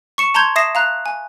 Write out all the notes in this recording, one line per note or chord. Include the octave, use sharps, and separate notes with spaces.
C#6 C#7 E7
A5 A#5 C6 G6 G#6
E5 D#6 A#6 C7 E7
F5 A#5 F#6
G#5